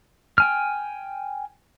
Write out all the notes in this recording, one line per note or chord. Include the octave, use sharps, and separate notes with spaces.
G5 G#5 F6